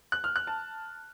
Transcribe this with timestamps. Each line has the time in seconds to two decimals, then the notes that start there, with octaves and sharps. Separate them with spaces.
0.12 F#6
0.24 F6
0.36 F#6
0.47 A5